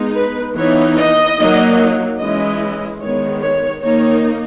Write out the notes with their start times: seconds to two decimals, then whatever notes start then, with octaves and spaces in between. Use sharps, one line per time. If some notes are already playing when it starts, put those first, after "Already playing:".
Already playing: G#3 B3 D#4
0.16 B4
0.56 E3 B3 D#4 C#5
0.97 D#5
1.38 F#3 A#3 D#4
2.20 E3 G#3 C#4 E4 D#5
3.01 D#3 G#3 B3 C#5
3.42 C#5
3.83 D#3 A#3 D#4 C#5